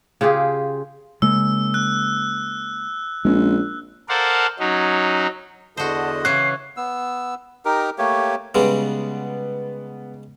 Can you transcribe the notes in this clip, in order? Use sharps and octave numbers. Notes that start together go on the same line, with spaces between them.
C#3 F4 G4 G#4
C#3 G#3 A#3 E6
F#6
A#1 G#3 C4 C#4
A4 A#4 C5 D5 F5 F#5
F#3 C#4 D#4
E2 D3 F#4 C5 D#5 A5
C#3 E3 C#4 C#5 F#6 C7
B3 E6
D#4 G4 A#4
A3 A#3 G4 C#5
C#3 G3 G#3 B3